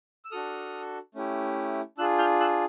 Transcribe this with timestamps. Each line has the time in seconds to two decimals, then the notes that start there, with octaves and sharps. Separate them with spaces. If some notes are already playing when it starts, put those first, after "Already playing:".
0.25 E6
0.32 D4 F#4 A4 D#6 F6
1.15 A3 C#4 E4 G4
1.98 D4 F4 G#4 E6 F#6
2.19 F6 G6
2.40 E6 F#6